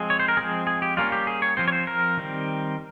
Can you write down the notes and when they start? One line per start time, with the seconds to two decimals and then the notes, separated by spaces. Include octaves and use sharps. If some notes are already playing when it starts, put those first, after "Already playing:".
Already playing: F3 G#3 C4 G#4
0.10 C#5
0.20 C5
0.28 A#4
0.37 F3 G#3 C4 G#4
0.67 G#4
0.82 G4
0.97 G3 A#3 C#4 F4
1.12 G4
1.27 G#4
1.42 C#5
1.57 F3 C4 C5
1.68 C#5
1.72 C5
1.87 A#4
2.17 D#3 G3 C4